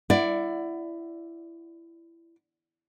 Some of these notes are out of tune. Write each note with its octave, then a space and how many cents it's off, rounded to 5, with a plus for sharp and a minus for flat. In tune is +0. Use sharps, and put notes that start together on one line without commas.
E4 +20 D5 +10 F#5 +0